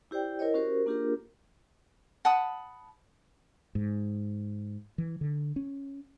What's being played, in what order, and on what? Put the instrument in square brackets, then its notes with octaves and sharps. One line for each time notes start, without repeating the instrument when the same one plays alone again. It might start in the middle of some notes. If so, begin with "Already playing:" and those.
[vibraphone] E4 G4 C5 D5 G5
E4 A#4 C5 C#5 D#5
C#4 F#4 G4 A#4 C5
A#3 D4 F4 G4 G#4 A#4
[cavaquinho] F#5 A5 B5 D#6
[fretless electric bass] G#2
E3
D3
C#4